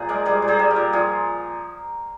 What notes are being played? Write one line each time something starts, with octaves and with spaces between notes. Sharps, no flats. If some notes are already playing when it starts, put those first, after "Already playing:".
Already playing: A#2 F3 G#4 C5
G#3 A#4 D5
G3 G#4 C5
A#2
G#4 C5
G3
G4 A#4
A#2
F3 F4 G#4